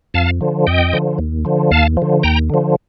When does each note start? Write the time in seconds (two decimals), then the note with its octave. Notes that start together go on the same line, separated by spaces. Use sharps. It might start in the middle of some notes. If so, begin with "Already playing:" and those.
0.14 F2 F5 A5
0.41 D3 F3
0.67 F2 D#5 G5
0.93 D3 F3
1.18 D#2
1.45 D3 F3
1.71 D#2 F5 A5
1.97 D3 F3
2.23 D#2 G5 A#5
2.49 D3 F3